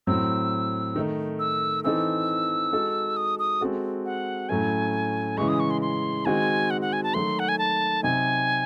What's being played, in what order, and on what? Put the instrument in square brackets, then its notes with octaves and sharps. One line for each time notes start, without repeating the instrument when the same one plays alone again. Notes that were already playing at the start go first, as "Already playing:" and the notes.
[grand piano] A2 F#3 C4 [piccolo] E6
[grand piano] D#3 A3 D#4
[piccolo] E6
[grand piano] E3 C4 D#4 A4 [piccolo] E6
[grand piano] G#3 D#4 F#4 A4
[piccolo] D#6
D#6
[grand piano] G#3 C4 F#4 A4
[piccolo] F#5
[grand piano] A2 F#3 A3 C#4 [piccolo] G#5
[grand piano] C#3 E3 G#3 [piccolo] C#6
[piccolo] D#6
C#6
C6
C6
[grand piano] D#3 G#3 C4 F#4 [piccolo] G#5
[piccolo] F#5
F#5
G#5
A5
[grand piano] D#3 F#3 A3 [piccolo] C6
[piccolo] F#5
G#5
A5
[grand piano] C3 F#3 C4 D#4 [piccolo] G#5